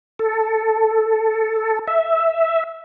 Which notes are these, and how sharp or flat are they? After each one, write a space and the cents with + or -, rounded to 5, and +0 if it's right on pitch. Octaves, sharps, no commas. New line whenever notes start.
A4 +5
E5 -5